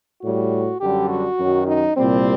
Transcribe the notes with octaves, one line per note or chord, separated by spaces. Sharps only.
A2 G3 F#4
F#2 D3 G3 G4
F#4
F#2 D#3 F#3
D#4
C2 A#2 G3 C4